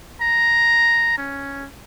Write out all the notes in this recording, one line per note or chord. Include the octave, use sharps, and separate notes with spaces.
A#5
C#4